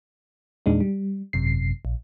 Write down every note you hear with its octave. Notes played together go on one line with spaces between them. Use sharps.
E2 A#2 G#3 D4 D#4
G3
G#1 F#2 C3 C7
A#1